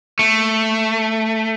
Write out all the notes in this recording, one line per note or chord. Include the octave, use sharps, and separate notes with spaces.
A3